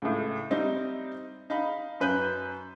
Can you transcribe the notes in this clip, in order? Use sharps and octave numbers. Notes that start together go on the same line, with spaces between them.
C#2 A2
G3 C4 D#4 E4
D#4 F5 B5
F#2 B4 G6